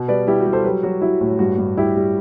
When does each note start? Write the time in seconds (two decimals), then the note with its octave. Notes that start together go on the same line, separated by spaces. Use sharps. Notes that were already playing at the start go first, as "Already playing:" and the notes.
Already playing: B2
0.08 G3 B4 D5
0.27 G3 E4 G4
0.40 F#4
0.46 G3
0.53 A4 C5
0.64 F#3 G4 B4
0.83 F#3 F#4
1.02 F#3 E4
1.21 A2
1.39 G2 F#4
1.58 G2
1.77 G3 E4 G4
1.96 G3